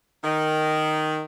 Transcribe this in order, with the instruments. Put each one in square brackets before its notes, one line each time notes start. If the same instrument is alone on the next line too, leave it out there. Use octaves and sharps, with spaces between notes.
[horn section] D#3